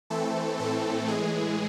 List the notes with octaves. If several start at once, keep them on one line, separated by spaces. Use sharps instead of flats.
E3 A3 C4 A4
A2 E3 A3 C4 A4
A2 E3 G#3 G#4